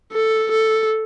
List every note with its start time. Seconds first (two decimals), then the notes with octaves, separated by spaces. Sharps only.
0.12 A4
0.51 A4